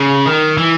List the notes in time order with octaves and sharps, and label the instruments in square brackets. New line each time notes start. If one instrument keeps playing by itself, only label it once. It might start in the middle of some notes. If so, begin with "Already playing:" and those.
Already playing: [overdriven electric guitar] C#3
D#3
E3